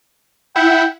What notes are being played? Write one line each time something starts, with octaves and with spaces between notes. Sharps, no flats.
E4 E5 F#5 G5